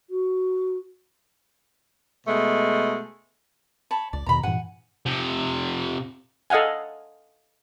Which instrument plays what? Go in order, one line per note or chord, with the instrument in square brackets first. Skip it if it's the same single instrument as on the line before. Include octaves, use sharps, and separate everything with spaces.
[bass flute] F#4
[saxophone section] B2 G#3 A3
[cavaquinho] C#5 A5 B5
[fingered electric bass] C#2 [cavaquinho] D5
[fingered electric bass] E2 B2 D#3 [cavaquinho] A#5 B5
[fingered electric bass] G2 A#2 E3 [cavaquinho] F#5 G#5
[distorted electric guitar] C3 F3
[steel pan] A4 D#5 F5 F#5 G#5